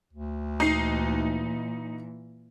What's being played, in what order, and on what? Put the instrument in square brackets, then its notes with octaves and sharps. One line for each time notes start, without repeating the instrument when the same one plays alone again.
[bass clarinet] D2
[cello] A#2 E3 [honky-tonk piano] D#4 C7